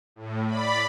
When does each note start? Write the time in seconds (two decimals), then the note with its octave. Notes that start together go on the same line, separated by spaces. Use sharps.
0.16 A2
0.47 D5 B5